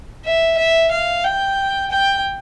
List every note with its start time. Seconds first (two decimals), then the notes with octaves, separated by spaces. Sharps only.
0.25 E5
0.58 E5
0.91 F5
1.24 G5
1.90 G5